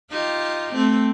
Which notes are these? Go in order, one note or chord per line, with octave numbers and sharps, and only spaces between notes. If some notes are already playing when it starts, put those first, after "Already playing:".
D#4 F4 G4
A3 C4